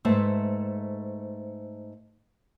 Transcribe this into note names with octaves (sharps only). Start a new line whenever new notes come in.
G#2 A3 B4 C5 E5